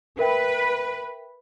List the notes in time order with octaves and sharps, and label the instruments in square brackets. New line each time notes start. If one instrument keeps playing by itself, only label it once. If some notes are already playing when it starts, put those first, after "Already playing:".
[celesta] A#4 E5 G5 [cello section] B4